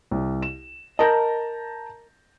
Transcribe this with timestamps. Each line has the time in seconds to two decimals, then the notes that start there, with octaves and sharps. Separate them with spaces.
0.11 C2
0.42 E7
0.99 A#4 D#5 A5 A#5 G6